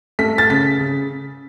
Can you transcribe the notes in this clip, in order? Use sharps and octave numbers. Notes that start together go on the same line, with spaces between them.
A3 B6
A6
C#3 B6
C#3